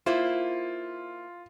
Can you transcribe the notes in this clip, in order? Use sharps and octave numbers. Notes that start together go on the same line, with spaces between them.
A#3 E4 F4 C5